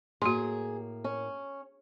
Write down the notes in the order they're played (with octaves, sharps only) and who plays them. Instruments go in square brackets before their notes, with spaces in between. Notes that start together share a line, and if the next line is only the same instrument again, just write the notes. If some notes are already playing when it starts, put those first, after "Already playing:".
[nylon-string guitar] A2 A#3 C#5 [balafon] F#4 C6 [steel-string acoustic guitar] G#4
[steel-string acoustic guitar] C#4